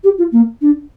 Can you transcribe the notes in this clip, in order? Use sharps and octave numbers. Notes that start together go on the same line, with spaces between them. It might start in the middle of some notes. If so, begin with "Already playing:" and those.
G4
F4
A#3
D4